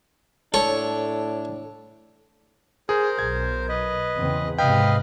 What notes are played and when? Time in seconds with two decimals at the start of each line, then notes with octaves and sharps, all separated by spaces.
0.54 A2 D4 A4 C#5
2.89 G#4 A#4 C5
3.19 B1 G#6
3.69 B4 D#5
4.17 E2 C#3 C4
4.59 G#2 C3 B4 D#5 F5 G5